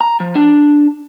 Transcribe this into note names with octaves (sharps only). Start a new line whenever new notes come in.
A#5
F3
D4